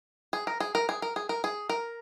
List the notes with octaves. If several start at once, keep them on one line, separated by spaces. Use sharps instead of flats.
G#4
A#4
G#4
A#4
G#4
A#4
G#4
A#4
G#4
A#4